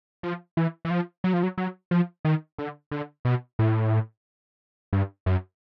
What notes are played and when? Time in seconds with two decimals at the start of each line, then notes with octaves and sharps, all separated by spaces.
0.23 F3
0.57 E3
0.85 E3
0.90 F3
1.24 F#3
1.33 F3
1.43 F#3
1.58 F#3
1.91 F3
2.25 D#3
2.58 D3
2.91 D3
3.25 B2
3.59 A2
4.93 G2
5.26 F#2